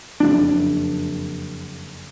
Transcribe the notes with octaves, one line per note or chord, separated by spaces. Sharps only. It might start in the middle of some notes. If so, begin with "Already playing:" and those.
F#1 F2 D4